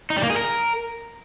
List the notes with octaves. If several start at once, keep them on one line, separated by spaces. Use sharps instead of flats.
D#4
G3
A#3
G#4
A#4